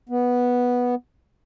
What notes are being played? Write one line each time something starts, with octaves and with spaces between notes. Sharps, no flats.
B3